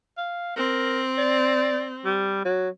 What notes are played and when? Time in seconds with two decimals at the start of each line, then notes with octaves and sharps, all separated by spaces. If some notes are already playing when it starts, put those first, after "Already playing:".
0.17 F5
0.56 C4 A#4
1.18 D5
2.05 G3
2.45 F#3